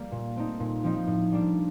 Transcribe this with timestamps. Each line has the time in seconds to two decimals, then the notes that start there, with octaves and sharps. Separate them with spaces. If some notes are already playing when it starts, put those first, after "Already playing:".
Already playing: G3 A#3
0.12 A#2
0.36 A3 C4 D#4
0.60 A#2
0.84 F3 C4 D#4
1.07 A2
1.32 G3 A#3 D4